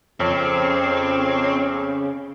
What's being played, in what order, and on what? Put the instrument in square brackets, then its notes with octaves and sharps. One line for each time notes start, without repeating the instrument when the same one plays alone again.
[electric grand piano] F2 [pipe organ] C#3 [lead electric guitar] C4 [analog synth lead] C#5